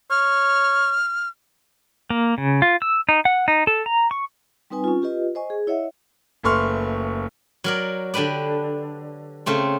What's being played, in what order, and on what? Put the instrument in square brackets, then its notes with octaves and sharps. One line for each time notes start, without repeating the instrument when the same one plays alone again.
[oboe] C#5 [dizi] F6
[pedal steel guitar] A#3
C#3
F4
E6
D#4
F#5
D#4
A4
A#5
C#6
[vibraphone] G3 C4 D#4 B4 G#5
C#4 F4
F4 G4 B4 D#5
C5 D#5 G#5 C#6
G#4
E4 C#5 D#5 E5 F#5
[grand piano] F#1 A3 B4 C6 C#6 F6
[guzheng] F#3 A#4 D5
D3 D4 G4 B4 D5
C#3 A3 C4